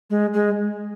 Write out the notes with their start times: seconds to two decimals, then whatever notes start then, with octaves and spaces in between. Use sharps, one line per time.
0.10 G#3
0.34 G#3